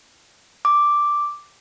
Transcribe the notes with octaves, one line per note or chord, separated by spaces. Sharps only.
D6